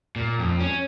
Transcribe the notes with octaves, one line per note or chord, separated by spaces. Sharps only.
A#2
F2
C#4